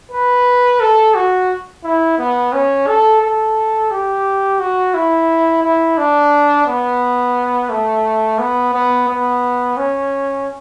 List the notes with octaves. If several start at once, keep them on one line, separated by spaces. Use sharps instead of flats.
B4
A4
F#4
E4
B3
C#4
A4
A4
G4
F#4
E4
E4
D4
B3
A3
B3
B3
B3
C#4